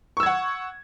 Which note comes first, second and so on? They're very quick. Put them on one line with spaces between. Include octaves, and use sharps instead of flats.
C#6 E6 G#6 F#5